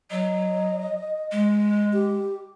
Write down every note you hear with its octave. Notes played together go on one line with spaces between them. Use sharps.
F#3 D#5
G#3
G4